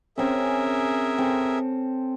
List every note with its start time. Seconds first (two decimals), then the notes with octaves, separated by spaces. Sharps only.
0.18 C4 C#4 G#4 A#4 E5
1.18 C4 A4